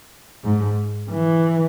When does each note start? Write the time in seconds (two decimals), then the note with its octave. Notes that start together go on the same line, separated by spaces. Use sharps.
0.44 G#2
1.10 E3